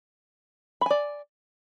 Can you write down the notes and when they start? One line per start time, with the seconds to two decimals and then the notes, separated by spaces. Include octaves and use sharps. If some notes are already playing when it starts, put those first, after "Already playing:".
0.81 B5
0.86 G#5
0.90 D5